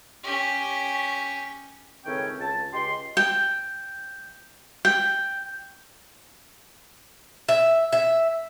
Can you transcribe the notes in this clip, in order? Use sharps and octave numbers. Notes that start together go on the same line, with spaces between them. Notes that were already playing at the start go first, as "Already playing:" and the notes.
C#4 G4
C#2 A2 D#3 C4 C#4 G5
C#2 A5
C#2 G#3 G4 C6
G5
G5
E5
E5